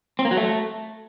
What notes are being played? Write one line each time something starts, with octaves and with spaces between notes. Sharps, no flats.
C4
A#3
F#3
A3